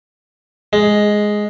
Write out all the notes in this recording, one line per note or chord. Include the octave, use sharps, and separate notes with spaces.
G#3